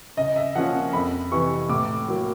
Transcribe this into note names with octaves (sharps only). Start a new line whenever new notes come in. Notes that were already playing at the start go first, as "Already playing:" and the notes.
C#3 D#5
E5
F3 A#3 C#4 F4 F#5
F2 B5
C3 E3 C#6
A2 D6
F#3 A#3